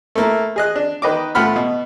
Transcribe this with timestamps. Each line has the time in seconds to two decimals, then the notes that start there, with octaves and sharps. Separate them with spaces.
0.15 A3 A#3 E4
0.56 G#4 D#5 F#6
0.76 D4
1.02 D#3 B4 D#5 D6
1.35 A2 A3 F4 F#5 B5 F6
1.56 B2